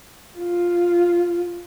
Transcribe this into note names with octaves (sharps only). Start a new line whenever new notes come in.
F4